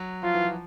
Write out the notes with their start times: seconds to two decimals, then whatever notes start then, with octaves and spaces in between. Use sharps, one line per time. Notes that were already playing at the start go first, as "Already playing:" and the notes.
Already playing: F#3
0.23 F3 F4
0.35 E3
0.45 F3